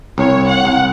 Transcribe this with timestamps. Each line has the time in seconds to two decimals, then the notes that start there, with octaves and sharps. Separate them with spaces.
0.18 C2 C#5
0.49 F#5
0.65 C2